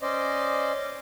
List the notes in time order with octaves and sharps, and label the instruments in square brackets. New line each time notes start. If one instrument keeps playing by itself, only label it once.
[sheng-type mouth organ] C#4 C5 D5 D#5